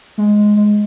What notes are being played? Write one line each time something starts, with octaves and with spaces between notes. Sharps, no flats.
G#3
G#3